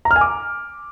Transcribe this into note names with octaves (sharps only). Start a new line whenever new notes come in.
A#5
F6
G#5
D6